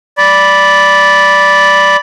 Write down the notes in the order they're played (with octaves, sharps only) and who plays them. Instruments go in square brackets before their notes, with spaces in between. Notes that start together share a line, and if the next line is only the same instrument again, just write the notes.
[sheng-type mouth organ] D5 B5